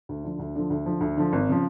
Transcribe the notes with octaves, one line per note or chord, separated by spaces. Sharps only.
D2
D3 F3
D2
D3 F3
D2
D3 F3
D2
D3 F3
G#1
C#3 F3